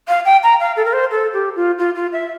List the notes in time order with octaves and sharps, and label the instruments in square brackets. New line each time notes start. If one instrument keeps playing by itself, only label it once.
[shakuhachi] F5
G5
A#5
F5
A4
A#4
C5
A4
G4
F4
F4
F4
E5